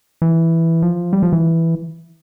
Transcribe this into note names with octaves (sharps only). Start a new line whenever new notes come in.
E3
F3
G3
F3
E3